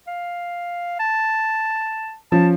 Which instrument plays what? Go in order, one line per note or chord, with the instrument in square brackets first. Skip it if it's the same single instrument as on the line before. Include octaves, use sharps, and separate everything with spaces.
[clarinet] F5
A5
[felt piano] F3 C#4 [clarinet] A5